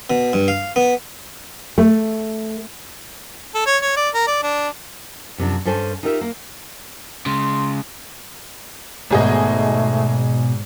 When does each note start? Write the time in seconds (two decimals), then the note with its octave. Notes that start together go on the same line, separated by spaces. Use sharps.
0.10 B2
0.33 G2
0.48 F5
0.76 B3
1.78 A3
3.55 A4
3.66 C#5
3.82 C#5
3.97 D5
4.14 A#4
4.27 D5
4.43 D4
5.38 F#2 C3 F3 D4
5.65 G2 C#4 A4 C5 G#5
6.03 D#4 F4 G4 A#4 E5
6.21 A#3
7.26 C#3 G#3 C6
9.10 G#1 G#2 B2 A3 G#4 D#5